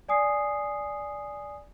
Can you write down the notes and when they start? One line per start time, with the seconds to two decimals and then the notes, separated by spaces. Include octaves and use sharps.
0.09 D5 G#5 D#6 C7